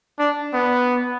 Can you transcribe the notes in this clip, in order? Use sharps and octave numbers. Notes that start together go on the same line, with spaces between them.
D4
B3